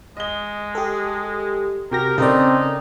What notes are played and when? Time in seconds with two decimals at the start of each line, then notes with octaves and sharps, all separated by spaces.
0.17 G#3 D#5 G7
0.75 G4 A4
1.92 C3 F#4 G4 A#4 G5 A#6
2.18 C#3 C4 D#4 A4 A#4 D5